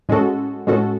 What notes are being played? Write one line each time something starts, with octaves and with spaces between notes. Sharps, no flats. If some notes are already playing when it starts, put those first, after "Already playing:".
A2 G#3 C#4 F#4 A4
A2 G#3 C#4 F#4 A4